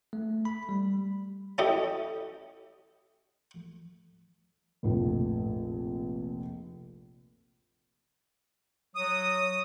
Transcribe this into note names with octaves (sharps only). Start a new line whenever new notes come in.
A3
B5
G3
C#4 E4 G4 A4 D#5
F1 A#1 A3
F#3 D#6